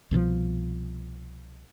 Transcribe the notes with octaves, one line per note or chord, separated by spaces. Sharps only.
C2 B2 D3 F3